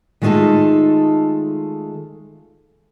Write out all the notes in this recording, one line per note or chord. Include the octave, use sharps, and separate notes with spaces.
D#3 G#3 A3 D#4 F4 A4